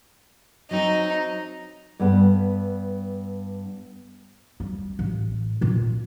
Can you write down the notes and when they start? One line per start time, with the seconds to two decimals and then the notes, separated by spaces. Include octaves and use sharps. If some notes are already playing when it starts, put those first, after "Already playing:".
0.71 F#3 C4 D#4
2.00 G2 B3
4.60 G3
4.99 A1
5.61 A#2 F4